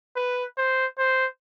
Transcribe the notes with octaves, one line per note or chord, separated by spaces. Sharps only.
B4
C5
C5